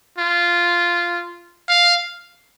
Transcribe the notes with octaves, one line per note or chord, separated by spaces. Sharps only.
F4
F5